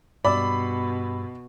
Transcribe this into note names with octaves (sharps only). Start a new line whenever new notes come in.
G2 B2 G4 D5 B5 E6